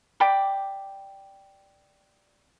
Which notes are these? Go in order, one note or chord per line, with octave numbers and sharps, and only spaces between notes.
D5 G5 B5 D6